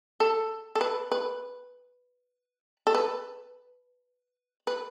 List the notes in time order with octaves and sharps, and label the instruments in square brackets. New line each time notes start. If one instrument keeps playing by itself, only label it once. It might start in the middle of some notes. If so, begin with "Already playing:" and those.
[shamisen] A4
A4
B4
B4
A4
B4
B4